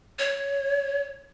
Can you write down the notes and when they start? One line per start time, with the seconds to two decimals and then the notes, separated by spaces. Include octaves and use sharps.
0.19 C#5